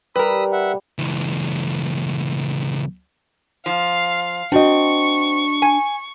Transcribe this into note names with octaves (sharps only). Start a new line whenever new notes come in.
G3 A#4 B4 B5 D#6 E6
E5 F#5
C#2 E3
F3 F5
C4 D4 F#4 D#5 C#6
G#5